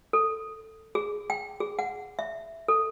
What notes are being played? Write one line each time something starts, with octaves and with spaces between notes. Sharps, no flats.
A4
G#4
G5
G#4
F#5
E5
A4